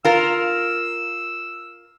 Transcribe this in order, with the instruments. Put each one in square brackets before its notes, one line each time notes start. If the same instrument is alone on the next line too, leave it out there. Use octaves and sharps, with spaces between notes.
[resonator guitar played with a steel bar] F4 A#4 [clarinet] E6